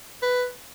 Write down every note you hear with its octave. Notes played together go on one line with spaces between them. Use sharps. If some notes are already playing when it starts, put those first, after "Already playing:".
B4